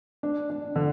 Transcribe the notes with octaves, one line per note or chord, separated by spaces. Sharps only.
D4
D4
D3